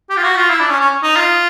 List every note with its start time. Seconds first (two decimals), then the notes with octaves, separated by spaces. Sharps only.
0.10 G4
0.17 F4
0.24 F#4
0.36 F4
0.50 E4
0.60 D4
0.70 C#4
0.81 C#4
1.03 D#4
1.16 F4